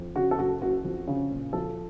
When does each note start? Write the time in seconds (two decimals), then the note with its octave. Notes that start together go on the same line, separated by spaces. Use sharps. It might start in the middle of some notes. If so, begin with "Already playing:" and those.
Already playing: F2
0.15 C#3 F#4
0.31 A4
0.38 F#1 F#4
0.62 F#1 F#4
0.84 F2
1.08 C#3
1.31 A#2
1.53 F3 A4